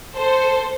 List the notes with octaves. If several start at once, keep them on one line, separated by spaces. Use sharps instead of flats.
A4 C5